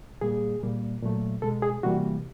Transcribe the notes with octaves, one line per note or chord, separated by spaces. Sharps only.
A#2 G3 A#3 G#4
A#2 G3 A#3
A#2 F#3 A3
B2 G#3 A4
G#4
C3 E3 G3 A#3 F#4